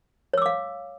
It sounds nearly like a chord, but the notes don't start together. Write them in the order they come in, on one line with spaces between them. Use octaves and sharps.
C#5 E6 D6 F5